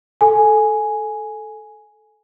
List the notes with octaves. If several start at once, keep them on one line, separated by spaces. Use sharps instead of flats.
A4 G#5